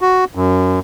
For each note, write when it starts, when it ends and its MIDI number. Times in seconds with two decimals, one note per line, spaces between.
0.01 0.25 66
0.35 0.79 42